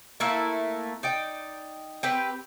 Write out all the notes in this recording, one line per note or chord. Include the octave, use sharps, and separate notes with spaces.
A3 A#3 E4
D#4 D5 G5
C4 G4 B4